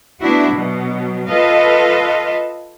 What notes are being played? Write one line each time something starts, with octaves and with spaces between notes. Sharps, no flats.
A3 B3 D4 E4 F#4
B2 F#3
F4 A4 B4 D#5 F5